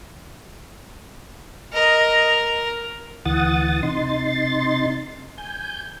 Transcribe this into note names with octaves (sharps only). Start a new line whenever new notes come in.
A#4 D#5
D2 E3 F#5 D#6 A6
C3 D#4 C6 A6
G#5 G6